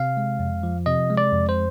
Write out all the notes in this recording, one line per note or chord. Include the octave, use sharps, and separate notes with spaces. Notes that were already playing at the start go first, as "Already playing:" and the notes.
Already playing: C3 F5
G#3
F2
F3
C3 D#5
G#3
D5
F2
C5